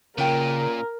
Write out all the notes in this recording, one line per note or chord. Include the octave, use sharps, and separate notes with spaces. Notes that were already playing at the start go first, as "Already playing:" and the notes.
A#2 C#3 C#4 F4 A#4 G5